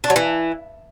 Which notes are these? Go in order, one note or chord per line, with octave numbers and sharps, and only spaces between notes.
D4
F#3
E3